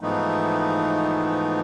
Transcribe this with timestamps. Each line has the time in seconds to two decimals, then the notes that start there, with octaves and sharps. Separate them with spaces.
0.01 G#2 E3 F3 A3 B3 D#4